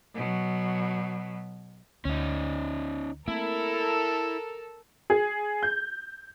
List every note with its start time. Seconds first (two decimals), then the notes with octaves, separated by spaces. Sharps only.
0.14 B2 F#3
2.05 D2 C#4 D#4
3.28 A3 A#3 C4 E4 A4 A#4
5.10 G#4
5.63 G6